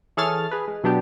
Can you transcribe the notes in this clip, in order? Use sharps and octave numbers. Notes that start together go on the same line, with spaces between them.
E3 G#4 A4 C#5 F6 A6
G#4 B4
G#3
B2 F#3 B3 D4 F#4 G4